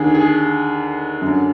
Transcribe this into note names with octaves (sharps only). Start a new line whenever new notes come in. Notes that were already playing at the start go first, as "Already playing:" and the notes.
Already playing: D#2 D3 G#4
G#4
F#2 D3